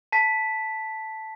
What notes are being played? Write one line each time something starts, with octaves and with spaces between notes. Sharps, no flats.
A5 B6